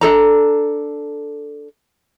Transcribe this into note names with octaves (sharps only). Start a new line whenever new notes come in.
D4 D#4 A4 A#5